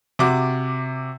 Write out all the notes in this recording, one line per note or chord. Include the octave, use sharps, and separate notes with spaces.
C3 F#4 D6